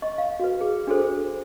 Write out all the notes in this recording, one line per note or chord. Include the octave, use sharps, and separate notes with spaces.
D#5 C#6
F5
F#4 B4
G#4
D4 F#4 G#4 A4 C5